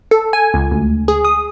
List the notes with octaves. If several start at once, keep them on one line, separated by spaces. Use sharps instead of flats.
A4
G#5
C#2
D2
G#4
D#6